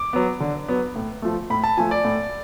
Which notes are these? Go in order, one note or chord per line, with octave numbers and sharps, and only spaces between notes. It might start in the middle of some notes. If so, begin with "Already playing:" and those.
Already playing: D6
F#3 B3
D3
F#3 B3
A2
F3 A3
A2 B5
A5
F3 A3 G#5
D5
A2